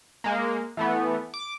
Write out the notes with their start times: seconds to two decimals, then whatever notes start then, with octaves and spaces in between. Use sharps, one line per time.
0.24 G#3 A#3
0.77 E3 A3 B3
1.34 D6